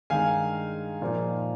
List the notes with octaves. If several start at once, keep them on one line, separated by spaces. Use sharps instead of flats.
G2 D#3 G#3 D#4 F5 G#5
A#2 F3 A#3 D#4